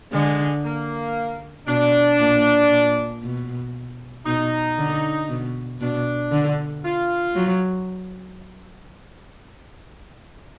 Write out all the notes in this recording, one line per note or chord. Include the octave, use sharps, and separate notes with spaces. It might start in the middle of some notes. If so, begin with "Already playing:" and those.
D3 G#3
A#3
B2 D4
A#2
A#2
B2
B2 D#4
D3
B2
B2 D4
D3
F4
F#3